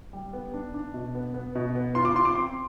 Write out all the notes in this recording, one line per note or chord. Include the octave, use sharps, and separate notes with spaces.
G3
B3
D4
D4
B2
B3
B3
B2
B3
F4 C6
D6
F4 C6
D6
C4 C6